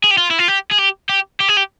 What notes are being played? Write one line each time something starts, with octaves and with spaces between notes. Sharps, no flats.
G#4
G4
F4
E4
F4
G4
G#4
G4
G4
G4
G#4
G4